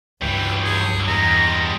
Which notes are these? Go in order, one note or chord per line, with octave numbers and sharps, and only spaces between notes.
C#2 G2 E3 F#3 G5
G#4
E2 G3 G#3 A#5